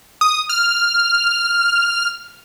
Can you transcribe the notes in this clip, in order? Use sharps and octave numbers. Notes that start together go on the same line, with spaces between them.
D#6
F6